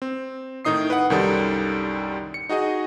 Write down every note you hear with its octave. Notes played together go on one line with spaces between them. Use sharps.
C4
A2 D#3 D#4 D#6 C7
B4 F#5
C2 F#2 D#3 G3 A4 D5
C#7
D#4 F#4 G#4 D#5